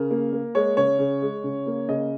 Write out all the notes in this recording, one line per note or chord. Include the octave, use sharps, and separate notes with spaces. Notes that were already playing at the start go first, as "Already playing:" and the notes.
Already playing: C#3 A#4
A#3
A#3
G#3 C#5
C#3 C#5
C#3
G#3
C#3
A#3
C#3 D#5